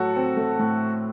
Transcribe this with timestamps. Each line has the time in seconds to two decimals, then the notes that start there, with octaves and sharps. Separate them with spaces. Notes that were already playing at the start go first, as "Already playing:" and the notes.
Already playing: A2 F#3 F#4 A4
0.16 C4
0.37 A3
0.59 A2